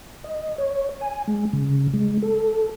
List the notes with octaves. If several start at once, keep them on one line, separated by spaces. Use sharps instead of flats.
D#5
C#5
G#5
G#3
C#3
G#3
A4